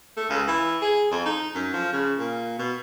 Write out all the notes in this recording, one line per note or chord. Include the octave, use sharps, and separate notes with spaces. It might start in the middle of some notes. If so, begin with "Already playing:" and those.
A3
C#2
E3
G#4
F2
D#4
F#2
F3
C#3
A#2
B2